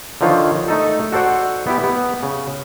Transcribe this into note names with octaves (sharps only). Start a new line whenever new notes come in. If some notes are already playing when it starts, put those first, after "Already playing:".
D3 D#3 F3 F4 C#5
A3 D#4 A4
F#4 A4 C5 D5 F#5
B3 E4 G4
B3
C#3